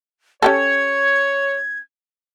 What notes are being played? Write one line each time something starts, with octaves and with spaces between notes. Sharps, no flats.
C#4 G4 A4 C#5 G#6